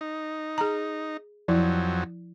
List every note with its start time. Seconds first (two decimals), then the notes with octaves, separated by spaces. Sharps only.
0.01 D#4
0.58 G#4 A#5
1.48 F2 F3 F#3 E4